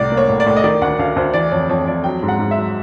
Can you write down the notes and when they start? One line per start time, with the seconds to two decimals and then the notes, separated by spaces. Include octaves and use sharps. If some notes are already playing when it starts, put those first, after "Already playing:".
Already playing: C2 A2 D5
0.12 A#3
0.17 C#5
0.29 A2
0.40 D5
0.46 A2
0.57 D#5
0.64 D#3 D5
0.82 D2 F#5
0.99 D2 F5
1.16 D2 C5
1.34 E3 D5
1.52 F2 C#5
1.69 F2 C#5
1.86 F2 D5
2.04 F#3 G5
2.23 G#2
2.28 F#5
2.39 G#2
2.51 E5
2.57 F#3